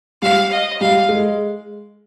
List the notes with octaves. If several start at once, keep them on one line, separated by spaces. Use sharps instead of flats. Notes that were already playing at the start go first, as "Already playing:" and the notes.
G3 F5
D#5
G3 F5
G#3